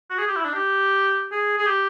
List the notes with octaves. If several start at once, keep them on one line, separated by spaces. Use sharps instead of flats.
F#4
G#4
G4
E4
D4
G4
G#4
G#4
G4